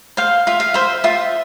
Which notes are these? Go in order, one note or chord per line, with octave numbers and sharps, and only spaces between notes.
C5 F5
F4 E5
F5
C5 E5
F4 E5